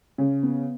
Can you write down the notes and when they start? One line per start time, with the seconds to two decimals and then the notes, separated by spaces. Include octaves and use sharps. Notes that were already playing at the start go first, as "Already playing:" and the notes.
0.18 C#3
0.43 B3